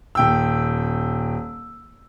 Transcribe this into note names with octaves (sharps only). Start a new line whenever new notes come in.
D#1 G5 E6